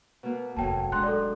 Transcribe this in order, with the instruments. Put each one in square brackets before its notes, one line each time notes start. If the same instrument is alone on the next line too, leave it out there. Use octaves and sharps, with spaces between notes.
[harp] B2 A#3 B3
[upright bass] F1 D#2 [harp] A2 F#3 A#3 [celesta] G5 A5
[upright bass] B2 F#3 [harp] G#3 D4 D#4 [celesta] C6 F#6
[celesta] A4 D5